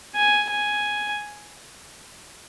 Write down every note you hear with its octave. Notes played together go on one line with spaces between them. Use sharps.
G#5
G#5